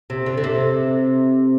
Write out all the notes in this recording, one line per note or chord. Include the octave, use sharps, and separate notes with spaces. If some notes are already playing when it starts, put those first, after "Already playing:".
C3
D3
D3
C3